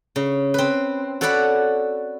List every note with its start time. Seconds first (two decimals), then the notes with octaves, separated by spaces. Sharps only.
0.16 C#3
0.54 C4 B4
1.21 F#4 A4 C#5 D5 F#5 B5